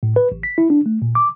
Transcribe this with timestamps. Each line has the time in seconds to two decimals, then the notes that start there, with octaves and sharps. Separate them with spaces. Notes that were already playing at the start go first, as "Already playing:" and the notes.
0.03 A2
0.16 B4
0.32 A1
0.43 B6
0.58 E4
0.70 D4
0.86 A3
1.02 A#2
1.15 D6